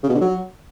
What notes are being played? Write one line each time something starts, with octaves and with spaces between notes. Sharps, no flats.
C#3
B2
D3
F#3